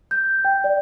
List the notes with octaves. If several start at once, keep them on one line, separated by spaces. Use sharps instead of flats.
G6
G5
D5